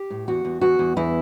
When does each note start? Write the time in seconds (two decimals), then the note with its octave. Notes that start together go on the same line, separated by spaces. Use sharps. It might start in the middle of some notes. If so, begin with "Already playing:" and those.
Already playing: G4
0.10 A2
0.28 E2 F#4
0.45 E2
0.61 E2 F#4
0.79 E2
0.97 E2 E4